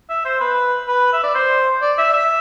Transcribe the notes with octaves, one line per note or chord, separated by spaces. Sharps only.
E5
C5
B4
B4
E5
D5
C5
D5
E5
E5